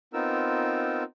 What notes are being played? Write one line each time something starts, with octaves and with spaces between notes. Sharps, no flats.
B3 C4 D#4 F4 A#4 E6